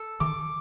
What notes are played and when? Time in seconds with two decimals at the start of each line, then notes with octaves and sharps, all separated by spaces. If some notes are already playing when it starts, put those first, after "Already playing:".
Already playing: A4
0.20 D#3 D6